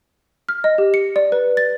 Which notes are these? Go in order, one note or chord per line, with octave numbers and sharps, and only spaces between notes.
F6
D#5
G4
C#7
D5
B4
A6